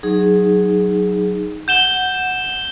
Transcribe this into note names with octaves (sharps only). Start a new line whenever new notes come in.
F#3 D#4 G#4
F#5 G6 E7 G7